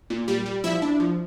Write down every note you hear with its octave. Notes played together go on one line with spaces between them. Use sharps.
A#2
G3
G3
F3 E4 E5
D4
F3